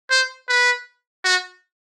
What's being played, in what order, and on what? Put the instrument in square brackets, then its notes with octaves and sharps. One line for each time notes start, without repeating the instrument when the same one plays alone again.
[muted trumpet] C5
B4
F#4